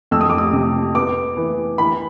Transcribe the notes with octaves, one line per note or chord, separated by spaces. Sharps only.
F2 E6
D#6
D6
D#6
C3
B3 D6
E3
E3 B5